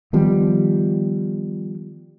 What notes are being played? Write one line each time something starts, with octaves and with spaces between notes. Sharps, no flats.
D#3 F3 G3 B3